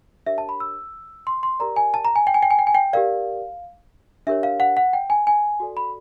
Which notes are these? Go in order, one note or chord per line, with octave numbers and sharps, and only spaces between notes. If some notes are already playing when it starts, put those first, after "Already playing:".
D4 G4 A#4 C#5 E5
A5
B5
E6
C6
C6
G4 A#4 D5 A#5
G#5
A5
A#5
G#5
G5
G#5
G5
G#5
G5
G#5
G5
G4 A#4 D5 F5
D4 G4 A#4 C#5 E5
F5
F#5
F#5
G5
G#5
G#5
F#4 A4 D5
B5